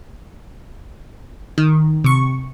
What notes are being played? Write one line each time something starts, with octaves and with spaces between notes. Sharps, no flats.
D#3
C3 C#6